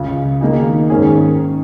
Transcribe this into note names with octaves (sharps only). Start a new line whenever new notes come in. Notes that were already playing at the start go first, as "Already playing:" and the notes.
Already playing: C#2 C#3 G#3 F4
D#3 A#3 D#4 G#4
G#2 D#3 C#4 G#4